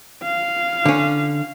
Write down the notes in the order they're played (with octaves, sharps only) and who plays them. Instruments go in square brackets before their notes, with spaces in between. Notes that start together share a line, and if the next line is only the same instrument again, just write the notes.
[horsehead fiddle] F5
[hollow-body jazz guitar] D3 C#4